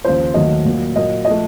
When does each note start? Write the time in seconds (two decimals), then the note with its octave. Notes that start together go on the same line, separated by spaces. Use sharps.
0.05 D#2 C#3 F3 C5
0.34 D#2 D#3 F#3 A3 D#5
0.65 A#2 F#3 A#3
0.96 A#2 F#3 A#3 D#5
1.25 D#5
1.27 F3 A3